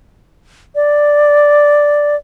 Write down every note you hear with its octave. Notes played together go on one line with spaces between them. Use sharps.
D5